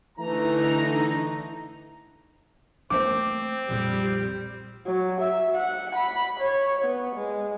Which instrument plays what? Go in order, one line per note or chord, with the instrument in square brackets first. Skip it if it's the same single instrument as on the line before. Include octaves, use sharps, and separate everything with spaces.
[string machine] D3 D#4 [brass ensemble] E3 A3 A#5
[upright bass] A3 A#3 [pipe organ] C4 [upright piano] C5 D6
[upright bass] A#1 F2 [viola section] G3
[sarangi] F#3
E5
F#5
B5
C#5
B3
G#3